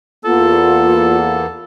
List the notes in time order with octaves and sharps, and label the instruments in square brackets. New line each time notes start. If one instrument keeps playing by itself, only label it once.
[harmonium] E2 A#3 B3 [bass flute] F4 [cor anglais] A4